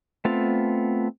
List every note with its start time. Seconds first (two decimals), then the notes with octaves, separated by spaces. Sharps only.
0.25 A3 B3 C4 F4 A5